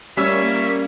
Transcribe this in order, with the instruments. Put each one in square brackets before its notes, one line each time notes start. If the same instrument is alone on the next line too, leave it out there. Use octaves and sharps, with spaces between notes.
[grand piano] G3 E6 [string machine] A#3 [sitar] C#4 [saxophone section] F4 C#5 E5